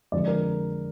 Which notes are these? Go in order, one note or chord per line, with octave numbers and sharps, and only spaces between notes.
F2 D3 F3 G#3 D5
A#4